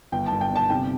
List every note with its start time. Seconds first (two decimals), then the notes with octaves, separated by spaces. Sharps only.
0.12 G1 G5
0.26 A5
0.32 G1
0.41 G5
0.50 G1
0.56 A5
0.70 C3 G5